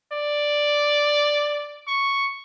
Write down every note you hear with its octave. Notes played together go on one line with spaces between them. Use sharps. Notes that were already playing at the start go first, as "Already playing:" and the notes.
D5
C#6